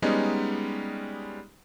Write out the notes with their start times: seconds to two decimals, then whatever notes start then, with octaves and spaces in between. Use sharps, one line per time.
0.02 G3 G#3 B3 C#4 D#4